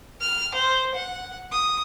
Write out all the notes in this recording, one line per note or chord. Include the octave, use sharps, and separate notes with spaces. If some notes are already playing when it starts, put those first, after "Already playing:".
F6
C5
F#5
D#6